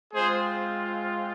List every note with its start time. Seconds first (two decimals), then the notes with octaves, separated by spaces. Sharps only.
0.14 G#3 C4 F4 G#4 C5